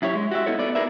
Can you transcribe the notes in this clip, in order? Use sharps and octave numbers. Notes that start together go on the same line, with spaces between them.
F#2 E4 G4 C#5
G#3
F#4 G4 E5
B3 D#4 E4 A4 C#5
B3 D5
G#4 A#4 B4 E5